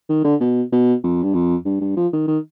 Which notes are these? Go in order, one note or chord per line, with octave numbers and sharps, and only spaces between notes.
D#3
D3
B2
B2
F2
G2
F2
G2
G2
F3
D#3
D#3